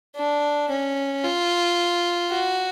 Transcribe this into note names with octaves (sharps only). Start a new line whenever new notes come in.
D4
C#4
F4
F#4